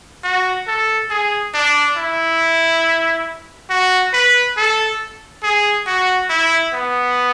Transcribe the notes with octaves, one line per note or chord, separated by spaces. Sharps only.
F#4
A4
G#4
D4
E4
F#4
B4
A4
G#4
F#4
E4
B3